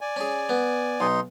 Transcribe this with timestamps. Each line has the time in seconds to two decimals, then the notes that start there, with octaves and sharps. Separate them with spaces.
0.01 D5 G#5
0.16 C#4 G#4
0.49 B3
1.00 B1 D#4 C6